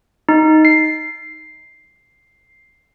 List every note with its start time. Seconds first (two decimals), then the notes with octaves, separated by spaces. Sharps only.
0.29 D#4
0.65 C7